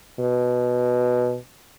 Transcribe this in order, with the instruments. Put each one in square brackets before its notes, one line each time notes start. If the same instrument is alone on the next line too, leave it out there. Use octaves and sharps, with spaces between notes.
[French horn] B2